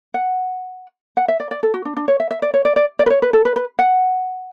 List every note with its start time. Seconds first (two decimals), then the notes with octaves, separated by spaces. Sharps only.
0.14 F#5
1.17 F#5
1.28 E5
1.40 D5
1.51 D5
1.63 A4
1.74 F#4
1.85 D4
1.97 D4
2.08 C#5
2.20 E5
2.31 E5
2.42 D5
2.54 C#5
2.65 D5
2.76 D5
2.99 D5
3.06 B4
3.10 C#5
3.22 B4
3.33 A4
3.45 B4
3.56 B4
3.79 F#5